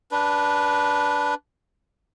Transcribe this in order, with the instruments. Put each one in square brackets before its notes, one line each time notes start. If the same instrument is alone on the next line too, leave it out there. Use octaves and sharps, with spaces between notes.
[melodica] D4 B4